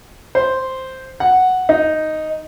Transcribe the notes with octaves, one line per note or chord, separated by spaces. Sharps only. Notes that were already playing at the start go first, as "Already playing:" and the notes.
C5
F#5
D#4